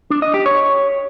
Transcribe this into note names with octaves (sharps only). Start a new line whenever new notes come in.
D4
D#5
G4
C#5